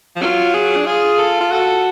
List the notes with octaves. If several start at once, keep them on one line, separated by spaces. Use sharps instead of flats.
F3
F#3 F4
G#4
D4
F4 G#4
A4
F4
F#4 A4